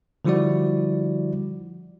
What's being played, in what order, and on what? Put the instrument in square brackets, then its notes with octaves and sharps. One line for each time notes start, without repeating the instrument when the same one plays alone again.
[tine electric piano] D3 F3 G3 E4 F#4 D5